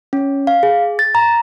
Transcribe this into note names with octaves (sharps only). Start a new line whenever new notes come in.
C#4
F5
G#4
A6
A#5